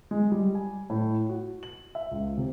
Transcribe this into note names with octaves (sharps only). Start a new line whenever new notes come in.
G#3
G3
G#5
A2
F#4
F#7
E5
C#2
C3